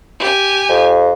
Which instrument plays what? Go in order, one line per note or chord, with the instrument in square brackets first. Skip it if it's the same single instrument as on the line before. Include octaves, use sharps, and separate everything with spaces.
[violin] G4 G#5
[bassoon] F2